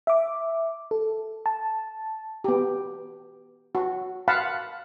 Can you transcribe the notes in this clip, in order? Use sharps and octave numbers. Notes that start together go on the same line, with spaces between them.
E5 D6
A4
A5
B3 G4
F#4
F5 F#5 A5 B5